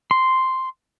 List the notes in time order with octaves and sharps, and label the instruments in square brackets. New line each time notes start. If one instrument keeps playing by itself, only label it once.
[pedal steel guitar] C6